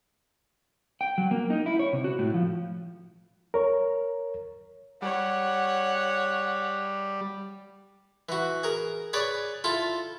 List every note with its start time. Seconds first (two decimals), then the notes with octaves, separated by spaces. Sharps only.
1.01 G5
1.18 F#3
1.31 A#3
1.50 D#4
1.66 E4
1.79 C#5
1.93 C3
2.04 F#4
2.19 A2
2.34 F3
3.54 A#4 C#5
5.02 G3 C#5 F#5
8.29 E3 F#4
8.63 G#4 A#4
9.13 G#4 B4 C#5 D5
9.64 E4 F4 A4